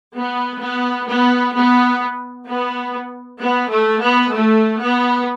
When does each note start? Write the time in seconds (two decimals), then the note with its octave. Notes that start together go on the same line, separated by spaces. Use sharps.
0.16 B3
0.62 B3
1.08 B3
1.56 B3
2.48 B3
3.42 B3
3.71 A3
4.03 B3
4.34 A3
4.81 B3